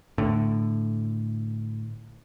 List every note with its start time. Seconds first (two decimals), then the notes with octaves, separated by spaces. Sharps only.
0.18 A2 D3